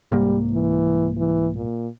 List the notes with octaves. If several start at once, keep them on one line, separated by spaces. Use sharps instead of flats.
C2 G#2 G3 A#3
E3
E3
A#2